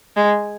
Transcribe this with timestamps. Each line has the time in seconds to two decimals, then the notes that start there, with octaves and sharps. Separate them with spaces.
0.17 G#3